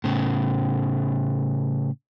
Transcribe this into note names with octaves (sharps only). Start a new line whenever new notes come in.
A2 C#3